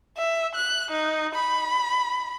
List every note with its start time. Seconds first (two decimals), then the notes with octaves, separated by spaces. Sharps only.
0.17 E5
0.55 F#6
0.91 D#4
1.35 B5